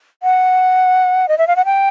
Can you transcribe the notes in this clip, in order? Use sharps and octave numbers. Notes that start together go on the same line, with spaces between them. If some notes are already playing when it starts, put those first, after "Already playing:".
F#5
D#5
E5
F5
F#5
G5